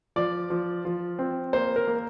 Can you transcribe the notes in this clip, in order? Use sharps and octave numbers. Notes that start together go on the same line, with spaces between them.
F3 D5
F3
F3
C4
A#3 C5
A#4
A#3